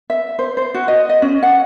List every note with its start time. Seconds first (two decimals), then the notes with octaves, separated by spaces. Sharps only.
0.10 E5
0.39 C5
0.57 C5
0.74 F#4
0.88 D#5
1.09 D#5
1.22 C#4
1.43 F#5